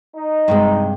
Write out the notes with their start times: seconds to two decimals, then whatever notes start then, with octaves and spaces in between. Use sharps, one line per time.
0.16 D#4
0.48 G2 C3 G#3